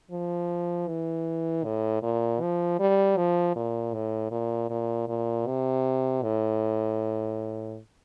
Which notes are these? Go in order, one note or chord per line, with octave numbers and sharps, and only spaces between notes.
F3
E3
A2
A#2
F3
G3
F3
A#2
A2
A#2
A#2
A#2
C3
A2